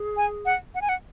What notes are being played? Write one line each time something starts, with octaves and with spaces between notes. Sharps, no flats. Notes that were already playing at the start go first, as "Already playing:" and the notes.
Already playing: G#4
G#5
F#5
F#5
G#5
F#5